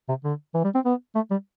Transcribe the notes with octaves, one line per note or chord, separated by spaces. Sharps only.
C3
D3
E3
G3
C4
B3
A3
G3